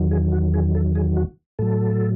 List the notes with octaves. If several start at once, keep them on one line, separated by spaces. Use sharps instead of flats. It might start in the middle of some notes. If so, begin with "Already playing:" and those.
Already playing: E2 D#3 F#3
G#4
F#4
G#4
A4
G#4
F#4
A2 F#3 A4